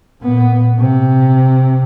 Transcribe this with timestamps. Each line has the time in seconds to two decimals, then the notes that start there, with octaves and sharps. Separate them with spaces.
0.21 A#2 B3
0.79 C3